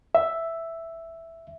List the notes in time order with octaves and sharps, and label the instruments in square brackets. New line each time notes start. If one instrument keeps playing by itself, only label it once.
[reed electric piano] E5